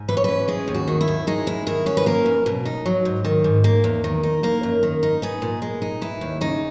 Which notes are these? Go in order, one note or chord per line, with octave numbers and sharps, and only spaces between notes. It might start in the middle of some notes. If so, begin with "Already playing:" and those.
Already playing: G#2
E3 B4
C#5
C#4 B4
G#3 G#4
D#2
F#4
D#3
E4
D#2
G#3 D#4
E2 E4
D#3 E4
C#4 F#4
B4
A#3 A#4
E2
B2
D#4
F#3
G#2
D#3
G#2
A#3
E2
D#3
D#4
A#3 A#4
F#2
D#3
D#4
B3 G#4
A#2
G#3
D#4
E3 E4
D#2
C#3 D#4